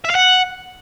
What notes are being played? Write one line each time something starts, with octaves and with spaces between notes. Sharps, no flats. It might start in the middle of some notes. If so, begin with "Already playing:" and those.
E5
F5
F#5